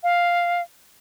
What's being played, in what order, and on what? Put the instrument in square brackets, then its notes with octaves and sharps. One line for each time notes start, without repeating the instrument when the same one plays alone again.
[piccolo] F5